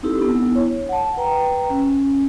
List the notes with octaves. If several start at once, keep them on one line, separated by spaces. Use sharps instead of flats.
C4 D#4 E4 G4 A4
B3 D4 E4
C#5
F#5 A5
B4 G5 A#5
C#4